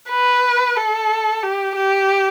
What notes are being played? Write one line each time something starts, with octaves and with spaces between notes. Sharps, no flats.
B4
A4
G4
G4